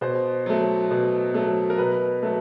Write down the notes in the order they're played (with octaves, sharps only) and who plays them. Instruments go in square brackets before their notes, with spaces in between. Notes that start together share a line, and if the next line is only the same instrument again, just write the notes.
[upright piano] B2 C5
F#3 A3
B2
F#3 A3
A#4
B2 B4
F#3 A3